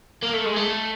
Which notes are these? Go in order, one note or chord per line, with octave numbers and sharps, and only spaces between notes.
A#3
A3
G#3
A3